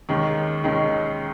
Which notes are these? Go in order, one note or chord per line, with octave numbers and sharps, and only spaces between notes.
D#2 D#3 G#3 C#4
D#2 D#3 G#3 C#4